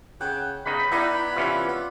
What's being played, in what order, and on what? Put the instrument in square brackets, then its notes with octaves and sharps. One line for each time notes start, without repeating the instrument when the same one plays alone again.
[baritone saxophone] C#3 [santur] F#5 G5
[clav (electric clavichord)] C#3 D#4 [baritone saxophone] B3 [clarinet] B5
[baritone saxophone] B3 [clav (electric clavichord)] D#4 [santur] E4 D5 F#5
[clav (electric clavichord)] C3 E3 C#4 [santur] F4
[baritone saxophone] B3